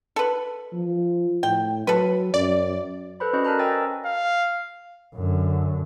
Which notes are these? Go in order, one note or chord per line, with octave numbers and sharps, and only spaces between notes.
A4 B4
F3
A2 G5
F#3 A4 B4
F#2 D5
A4 B4 C5 B5
C#4 F#4 B4 C5 D5 D#5
A#4 A5 A#5 F#6
C#5 D#5 G5 G#5 E6 A6
F5
F#2 D3